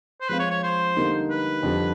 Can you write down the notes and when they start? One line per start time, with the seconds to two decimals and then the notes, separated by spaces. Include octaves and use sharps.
0.21 C5
0.29 F3 G#3 C4 F4 B4
0.39 C#5
0.51 C#5
0.63 C5
0.97 D3 G3 A#3 D#4
1.30 B4
1.63 F2 D3 G3